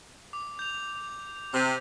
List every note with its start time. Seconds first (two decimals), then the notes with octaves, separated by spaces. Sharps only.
0.33 D6
0.59 G6 F7
1.53 C3